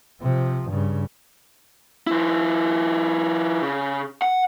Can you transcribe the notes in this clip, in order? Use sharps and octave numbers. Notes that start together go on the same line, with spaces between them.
C3 F3
G2 C#3
F3 E4
C#3
F#5